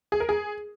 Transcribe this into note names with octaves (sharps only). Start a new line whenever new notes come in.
G#4
A#4
G#4